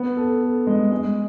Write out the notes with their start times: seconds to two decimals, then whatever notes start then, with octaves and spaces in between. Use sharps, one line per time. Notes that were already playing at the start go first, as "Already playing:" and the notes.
Already playing: B3
0.17 A4
0.42 A4
0.67 G#3
0.92 G#3